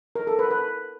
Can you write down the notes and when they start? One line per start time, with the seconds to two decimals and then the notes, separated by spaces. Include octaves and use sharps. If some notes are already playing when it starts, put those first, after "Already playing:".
0.16 A#4
0.27 A4
0.39 B4
0.51 B4